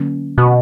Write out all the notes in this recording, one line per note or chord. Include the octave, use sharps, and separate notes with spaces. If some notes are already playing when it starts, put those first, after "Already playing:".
Already playing: D3 F#3 A#3 C#4
B2